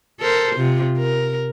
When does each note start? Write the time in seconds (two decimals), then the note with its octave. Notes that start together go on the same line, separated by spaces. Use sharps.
0.20 A4 A#4 C5
0.56 C3 F4
0.98 A#4